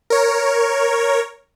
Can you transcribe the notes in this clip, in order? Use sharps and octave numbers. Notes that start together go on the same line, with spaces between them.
A#4 C#5